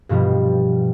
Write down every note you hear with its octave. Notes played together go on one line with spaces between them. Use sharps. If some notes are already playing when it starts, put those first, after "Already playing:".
G2 B2 F3 G3